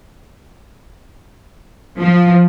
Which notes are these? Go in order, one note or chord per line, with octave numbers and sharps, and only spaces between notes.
F3